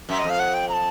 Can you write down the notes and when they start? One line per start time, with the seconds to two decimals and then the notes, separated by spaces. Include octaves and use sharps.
0.09 F#2 E5
0.19 D#5
0.24 F2
0.30 F5
0.39 F#5
0.54 G5
0.69 A#5
0.73 A5